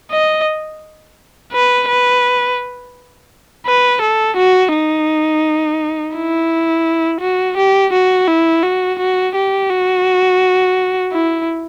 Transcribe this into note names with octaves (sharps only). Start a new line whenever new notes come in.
D#5
B4
B4
B4
A4
F#4
D#4
E4
F#4
G4
F#4
E4
F#4
F#4
G4
F#4
E4